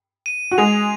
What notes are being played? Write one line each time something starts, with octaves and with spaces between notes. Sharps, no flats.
D#7
F#4
G#3 G#4 F7